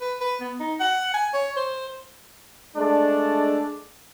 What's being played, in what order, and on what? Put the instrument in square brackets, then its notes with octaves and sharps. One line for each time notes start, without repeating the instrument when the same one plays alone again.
[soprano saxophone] B4
B4
B3
D#4
F#5
G#5
C#5
C5
[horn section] G#3 A3 D4